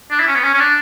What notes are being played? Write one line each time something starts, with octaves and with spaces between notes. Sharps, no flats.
D4
E4
C#4
B3
C#4
C#4
D4